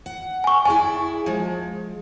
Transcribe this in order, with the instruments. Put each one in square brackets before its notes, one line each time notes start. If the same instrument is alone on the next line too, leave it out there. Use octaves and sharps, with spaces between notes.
[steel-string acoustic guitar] F#5
[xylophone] G#5 C#6
[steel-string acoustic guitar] E4 G#4 D5 [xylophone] G#5
[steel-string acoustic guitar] F3 G#3